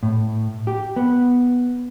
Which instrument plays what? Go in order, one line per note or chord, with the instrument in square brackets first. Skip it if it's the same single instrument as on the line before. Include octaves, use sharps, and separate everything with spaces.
[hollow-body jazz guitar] A2
G4
B3